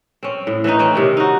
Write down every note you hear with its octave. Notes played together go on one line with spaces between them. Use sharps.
C4 C#4
A2
E3 C4 C#4 D#4
E3 C4 C#4
C3 D#3 C#4
D#4 F#4